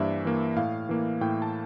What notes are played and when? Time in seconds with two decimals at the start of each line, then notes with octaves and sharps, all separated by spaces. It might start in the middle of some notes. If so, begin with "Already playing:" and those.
Already playing: G2 E3 A#3 C5 D5 E5
0.25 E3 A#3
0.56 A2 F5
0.89 E3 A#3
1.21 A2 G5
1.42 A5